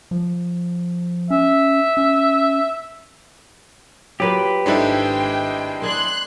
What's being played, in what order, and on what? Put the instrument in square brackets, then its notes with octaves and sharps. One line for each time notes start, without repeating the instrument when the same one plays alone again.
[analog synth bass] F3
[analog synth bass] C#4 [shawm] E5
[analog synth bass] C#4
[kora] F#3 A#3 F4 [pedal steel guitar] G4 B4
[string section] G#1 G5 [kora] G#2 A3 A4 [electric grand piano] G#3 D4 E4
[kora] A#3 G#4 D5 [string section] C6 F#6